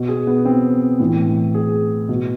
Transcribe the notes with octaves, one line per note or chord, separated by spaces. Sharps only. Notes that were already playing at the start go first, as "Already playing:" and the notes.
Already playing: B2
G#4
B3
C4
A2 E3
G#4
B2